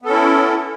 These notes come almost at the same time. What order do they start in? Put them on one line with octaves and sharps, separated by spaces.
B3 A4 C#4 E4